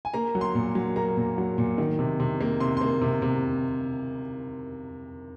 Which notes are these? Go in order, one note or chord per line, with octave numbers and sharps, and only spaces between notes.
G#5
A#3 A#5
F#3
C6
A#2
F#3
A#3 A#5
A#2
F#3
A#2
D#3
C3
C3
A#3
C3 C6
A#3 C6
C3
C3